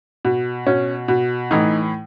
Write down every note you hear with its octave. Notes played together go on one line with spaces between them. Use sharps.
B2
B2 C#4
B2
A2 E3 D#4